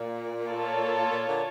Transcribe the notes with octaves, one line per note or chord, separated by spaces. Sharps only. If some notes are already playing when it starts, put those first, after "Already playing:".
Already playing: A#2
F4 A4 C#5
A#2
A#2 D3